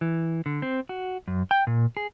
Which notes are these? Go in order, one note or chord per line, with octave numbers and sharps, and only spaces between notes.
E3
D3
C4
F#4
F#2
G5
A#2
G#4